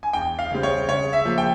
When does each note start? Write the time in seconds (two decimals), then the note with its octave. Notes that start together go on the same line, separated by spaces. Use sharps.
0.03 G#5
0.13 E2 G5
0.39 F5
0.51 C#3 G3 C4
0.63 C#5
0.88 C#3 C#5
1.13 E5
1.25 F3 A#3
1.38 G5